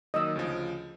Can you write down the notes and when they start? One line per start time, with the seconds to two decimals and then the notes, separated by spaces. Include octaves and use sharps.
0.14 D#3 F#3 A#3 D#5 E6
0.36 D2 C#3 F3